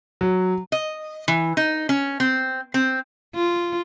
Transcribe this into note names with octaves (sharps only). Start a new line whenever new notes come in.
F#3
D#5
E3
D#4
C#4
C4
C4
F4